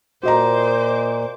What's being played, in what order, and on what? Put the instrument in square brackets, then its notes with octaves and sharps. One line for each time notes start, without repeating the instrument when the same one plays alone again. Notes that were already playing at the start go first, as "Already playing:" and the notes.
[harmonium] A#2 [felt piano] F#4 D#5 A#5 [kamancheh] C5 D6